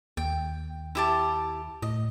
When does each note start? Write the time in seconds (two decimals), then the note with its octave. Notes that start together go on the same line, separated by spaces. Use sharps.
0.17 D#2 G5
0.95 E4 G4 A5
1.82 A2 D#5